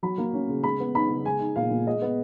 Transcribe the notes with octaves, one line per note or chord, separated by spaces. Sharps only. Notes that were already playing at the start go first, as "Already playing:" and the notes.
F#3 B5
A#3
C#4
C#3
G#3 B5
B3
D#4 B5
C#3
G#3 G#5
D#4
A#2 F5
A#2
G#3 D#5
B3